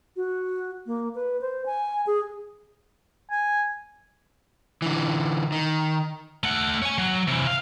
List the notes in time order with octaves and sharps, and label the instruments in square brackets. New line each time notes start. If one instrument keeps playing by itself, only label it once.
[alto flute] F#4
A#3
B4
C5
G#5
G#4
[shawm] G#5
[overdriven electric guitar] D3 E3
D#3
[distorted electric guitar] A3 F#5
C#5 G#5
F#3
C3 E3
F5